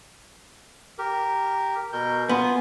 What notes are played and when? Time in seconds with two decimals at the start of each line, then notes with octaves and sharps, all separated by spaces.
0.98 G4 A#4
1.93 B2 A#4 G6
2.29 B3 F4 G#5